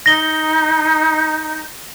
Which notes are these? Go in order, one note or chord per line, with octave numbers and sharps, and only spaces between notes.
D#4 A#6 G7